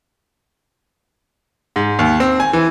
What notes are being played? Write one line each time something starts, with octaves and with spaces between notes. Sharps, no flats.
G#2
D#2
C4
G#5
E3